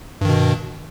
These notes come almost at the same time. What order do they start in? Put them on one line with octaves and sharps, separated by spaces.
G2 D#3 B2